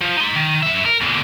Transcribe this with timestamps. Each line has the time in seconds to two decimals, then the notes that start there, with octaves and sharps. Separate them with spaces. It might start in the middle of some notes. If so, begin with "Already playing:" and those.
0.02 F3
0.17 D#4 C6
0.36 D#3
0.62 F#2 E5
0.85 A#4
1.01 E2 D3